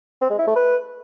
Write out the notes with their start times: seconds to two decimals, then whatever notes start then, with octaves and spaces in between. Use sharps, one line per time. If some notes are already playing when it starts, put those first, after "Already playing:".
0.21 C4
0.30 G#3
0.39 E4
0.47 A3
0.56 B4